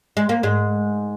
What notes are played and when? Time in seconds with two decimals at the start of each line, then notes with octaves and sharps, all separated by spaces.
0.17 G#3
0.29 A#3
0.43 G#2 G#3